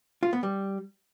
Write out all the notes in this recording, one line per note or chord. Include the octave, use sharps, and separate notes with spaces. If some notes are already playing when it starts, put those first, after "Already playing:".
F4
B3
G3